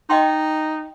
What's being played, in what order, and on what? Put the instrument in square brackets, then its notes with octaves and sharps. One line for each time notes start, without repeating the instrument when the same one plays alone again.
[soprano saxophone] D#4 [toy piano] D#5 G5 C6